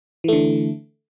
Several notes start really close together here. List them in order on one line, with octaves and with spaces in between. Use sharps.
E3 A3 D3